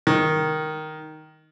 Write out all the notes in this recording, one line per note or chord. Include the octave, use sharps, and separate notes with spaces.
D#3